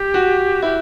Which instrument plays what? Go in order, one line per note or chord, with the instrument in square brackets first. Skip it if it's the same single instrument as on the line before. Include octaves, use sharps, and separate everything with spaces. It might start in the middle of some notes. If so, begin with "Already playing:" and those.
Already playing: [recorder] G4
[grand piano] F#4
[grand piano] E4 [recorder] G4